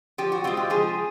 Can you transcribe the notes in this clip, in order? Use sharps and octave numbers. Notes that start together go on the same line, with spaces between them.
F3 G4
F#4
G#3 C4 F4
G4
F3 G#4